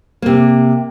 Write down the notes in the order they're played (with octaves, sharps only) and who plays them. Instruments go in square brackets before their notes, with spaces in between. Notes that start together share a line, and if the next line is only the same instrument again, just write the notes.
[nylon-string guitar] C3 A#3